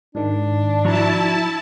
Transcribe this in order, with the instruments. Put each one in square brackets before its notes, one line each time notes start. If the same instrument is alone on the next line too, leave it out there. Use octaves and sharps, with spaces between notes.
[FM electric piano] G#2 D#3 [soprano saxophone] D4
[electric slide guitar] F3 F#4 A#5 [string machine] E4 A5